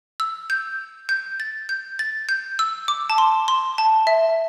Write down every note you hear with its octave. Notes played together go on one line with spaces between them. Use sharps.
E6
G6
G6
A6
G6
A6
G6
E6
D6
A5
C6
C6
A5
E5